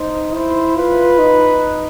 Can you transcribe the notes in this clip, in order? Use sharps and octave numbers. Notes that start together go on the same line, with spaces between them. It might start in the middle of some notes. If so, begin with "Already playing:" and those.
Already playing: D#4 C5
E4 C5
F4 B4
D#4